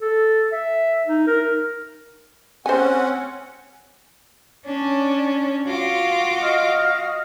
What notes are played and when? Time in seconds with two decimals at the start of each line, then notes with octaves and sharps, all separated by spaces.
0.01 A4
0.52 E5
1.07 D#4
1.27 A#4
2.66 C4 C#4 C5 F#5 G#5
4.65 C#4 D4
5.67 F4 F#4 F5 D6
6.41 D#5 D#6 F6